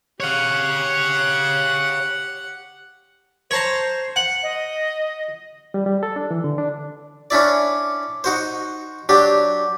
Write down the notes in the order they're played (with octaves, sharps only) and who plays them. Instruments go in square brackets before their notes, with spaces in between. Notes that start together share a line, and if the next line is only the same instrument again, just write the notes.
[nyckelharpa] G4 F#5 [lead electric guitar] C#5 F5
[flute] C5 [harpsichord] C#5 A5 A#5
[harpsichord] F#5
[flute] D#5
[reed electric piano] G3
G3
A4
D4
E3
D3
D4
[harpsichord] C#4 D4 E4 D5
D#4 F#4 C5
F#3 D4 G4